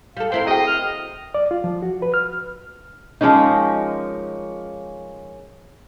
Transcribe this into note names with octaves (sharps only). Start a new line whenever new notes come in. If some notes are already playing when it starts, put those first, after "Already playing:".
G3 A4 F5
C4 E4 A#4 C6
F#3 G#4 D#5 G5
F6
D5
F4
F3
F#4
B4
F6
F3 G#3 A#3 C#4 D#4